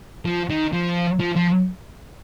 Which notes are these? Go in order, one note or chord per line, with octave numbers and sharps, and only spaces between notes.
F3
D#3
F3
F3
F3